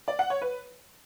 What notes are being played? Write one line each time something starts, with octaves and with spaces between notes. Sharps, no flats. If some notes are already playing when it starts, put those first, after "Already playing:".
D5
F#5
C#5
B4